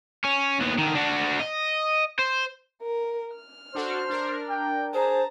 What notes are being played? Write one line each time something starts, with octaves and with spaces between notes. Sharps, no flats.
C#4
D#2 B3
D3 D#3
D4 F#4
D#5
C5
A#4
F6
D4 F#4 A4 C5
D4 A#4
G5
G#4 C5 A5 A#5